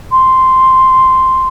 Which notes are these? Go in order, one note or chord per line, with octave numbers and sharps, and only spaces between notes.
C6